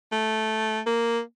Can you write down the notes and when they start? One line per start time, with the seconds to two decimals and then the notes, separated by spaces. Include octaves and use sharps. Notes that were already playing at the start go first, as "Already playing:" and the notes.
0.12 A3
0.86 A#3